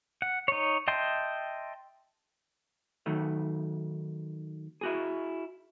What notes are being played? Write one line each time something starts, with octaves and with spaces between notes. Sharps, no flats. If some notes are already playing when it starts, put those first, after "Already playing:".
F#5
D#4 C#5
D#5 E5 G5 A5 C6
D#3 F#3 A3
E4 F#4 G#4